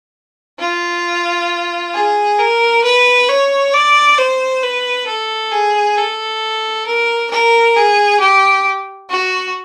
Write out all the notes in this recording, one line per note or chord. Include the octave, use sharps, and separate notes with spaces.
F4
G#4
A#4
B4
C#5
D5
C5
B4
A4
G#4
A4
A#4
A#4
G#4
G4
F#4